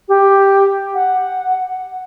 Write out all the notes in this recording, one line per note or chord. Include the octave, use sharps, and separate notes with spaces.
G4
F#5